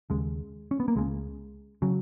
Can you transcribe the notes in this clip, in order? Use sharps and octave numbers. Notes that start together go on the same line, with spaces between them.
D#2 C#3 G#3
C#4
B3
A#3
C#2 C#3 G#3
C#3 F#3